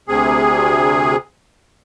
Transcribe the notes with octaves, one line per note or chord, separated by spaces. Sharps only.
D2 C3 G#4